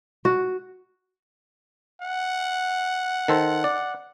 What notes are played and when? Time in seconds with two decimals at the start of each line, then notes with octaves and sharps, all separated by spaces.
0.25 F#4
2.02 F#5
3.28 D#3 A4 C5
3.64 D5